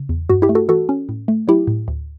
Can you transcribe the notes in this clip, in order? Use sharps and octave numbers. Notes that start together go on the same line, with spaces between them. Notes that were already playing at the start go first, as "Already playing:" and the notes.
Already playing: C#3
E2
G2 F#4
E4 G4
A3
F#4 A4
E3 F#4 A4
C#4
A2
A3
F#3 E4 G4
A2
D2